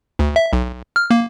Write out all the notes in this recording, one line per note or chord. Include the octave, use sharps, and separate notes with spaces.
D2
E5
B1
F6
A#3